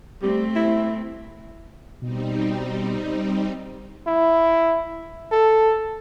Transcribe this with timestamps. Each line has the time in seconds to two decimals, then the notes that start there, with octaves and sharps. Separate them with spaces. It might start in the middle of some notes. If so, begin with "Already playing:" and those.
0.23 G3 A3 C4
0.56 E4
2.01 B2 G3 C4 D#4
4.07 E4
5.32 A4